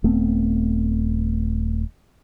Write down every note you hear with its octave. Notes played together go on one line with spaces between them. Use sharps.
D#1 A3 B3 C4